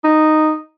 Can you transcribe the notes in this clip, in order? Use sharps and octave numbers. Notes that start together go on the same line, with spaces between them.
D#4